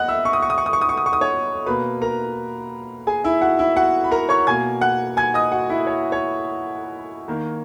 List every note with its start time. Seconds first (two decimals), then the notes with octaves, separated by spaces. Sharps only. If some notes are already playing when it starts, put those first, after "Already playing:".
Already playing: A#3 D#5 F#5 F#6
0.08 E5 E6
0.25 C#6
0.33 D#6
0.42 C#6
0.50 D#6
0.58 C#6
0.66 D#6
0.73 C#6
0.81 D#6
0.89 C#6
0.97 D#6
1.06 C#6
1.13 D#6
1.21 C#5 C#6
1.66 B2 A#3 B4 B5
2.02 A#4 A#5
3.07 G#4 G#5
3.24 E4 E5
3.41 F#4 F#5
3.59 E4 E5
3.76 F#4 F#5
4.04 B5
4.11 A#4 A#5
4.29 C#5 C#6
4.47 B2 A#3 G#5 G#6
4.81 F#5 F#6
5.17 G#5 G#6
5.34 D#5 D#6
5.52 F#4 F#5
5.70 E4 E5
5.87 C#5
6.12 C#5
7.28 D#3 A#3